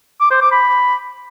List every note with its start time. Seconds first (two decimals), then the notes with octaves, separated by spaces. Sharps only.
0.20 D6
0.31 C5
0.41 D6
0.51 B5